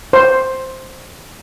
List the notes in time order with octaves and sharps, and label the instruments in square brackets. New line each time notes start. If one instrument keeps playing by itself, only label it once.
[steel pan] C5